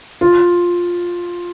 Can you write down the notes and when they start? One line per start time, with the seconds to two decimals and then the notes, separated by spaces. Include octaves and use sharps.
0.21 F4